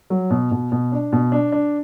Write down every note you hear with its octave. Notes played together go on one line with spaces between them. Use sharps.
F#3
B2
B2
B2
D4
B2
D4
D4